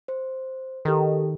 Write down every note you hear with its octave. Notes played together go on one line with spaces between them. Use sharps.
C5
D#3 G4 A4 A#4